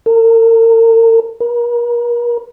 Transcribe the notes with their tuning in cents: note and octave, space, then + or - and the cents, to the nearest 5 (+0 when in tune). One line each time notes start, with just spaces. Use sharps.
A#4 -40
A#4 +40